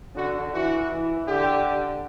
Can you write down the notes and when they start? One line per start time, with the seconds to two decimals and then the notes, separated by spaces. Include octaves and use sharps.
0.16 D3 F#4
0.53 E3 F#4
0.91 E3
1.27 D3 G4